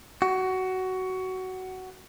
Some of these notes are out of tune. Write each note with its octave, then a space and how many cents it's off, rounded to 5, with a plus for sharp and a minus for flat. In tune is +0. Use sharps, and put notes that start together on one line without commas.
F#4 +15